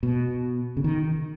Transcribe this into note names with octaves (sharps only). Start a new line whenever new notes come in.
B2
C#3
D#3